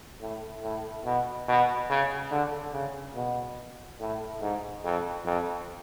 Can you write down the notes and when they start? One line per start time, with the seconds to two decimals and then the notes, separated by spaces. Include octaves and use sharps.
0.21 A2
0.63 A2
1.05 B2
1.48 B2
1.90 C#3
2.31 D3
2.74 C#3
3.15 B2
4.00 A2
4.41 G#2
4.84 F2
5.25 F2